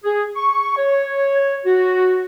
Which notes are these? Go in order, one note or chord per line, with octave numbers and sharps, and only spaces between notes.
G#4
C#6
C#5
F#4